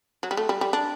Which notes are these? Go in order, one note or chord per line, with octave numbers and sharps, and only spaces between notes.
F#3
G3
A3
G3
G3
D4